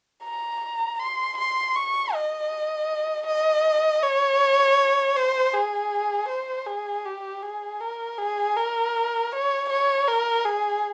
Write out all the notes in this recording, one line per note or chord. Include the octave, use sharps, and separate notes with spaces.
A#5
C6
C6
C#6
D#5
D#5
C#5
C5
G#4
C5
G#4
G4
G#4
A#4
G#4
A#4
C#5
C#5
A#4
G#4